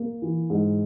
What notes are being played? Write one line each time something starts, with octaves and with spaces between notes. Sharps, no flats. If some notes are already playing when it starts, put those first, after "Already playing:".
Already playing: A#3
E3
G#2